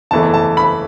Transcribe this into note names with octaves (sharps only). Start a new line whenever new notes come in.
F#1 E2 E3 A3 A5
A5
B5